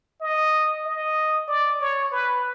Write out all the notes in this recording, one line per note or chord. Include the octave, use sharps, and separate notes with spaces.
D#5
D#5
D5
C#5
B4